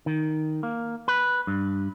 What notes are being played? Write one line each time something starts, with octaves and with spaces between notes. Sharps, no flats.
D#3
A#3
B4
G2